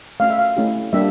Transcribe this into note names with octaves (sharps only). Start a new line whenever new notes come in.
A3 C#4 F#4 F5
E5
F5
A3 C#4 E4 G4
G3 A#3 D4 G4 E5